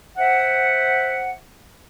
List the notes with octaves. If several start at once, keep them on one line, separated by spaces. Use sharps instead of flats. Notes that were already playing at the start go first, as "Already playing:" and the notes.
C5 E5 F#5